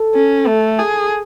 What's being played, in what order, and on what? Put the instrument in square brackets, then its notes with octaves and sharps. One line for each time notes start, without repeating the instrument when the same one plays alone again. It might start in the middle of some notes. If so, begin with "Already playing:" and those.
Already playing: [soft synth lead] A4
[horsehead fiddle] C#4
A3
G#4